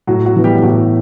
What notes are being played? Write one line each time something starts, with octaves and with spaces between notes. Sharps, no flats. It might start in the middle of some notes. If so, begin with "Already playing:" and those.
A2 F#3 F#4
F#3 F#4
E3 B3
G3 G4
G4
A2 F#3 F#4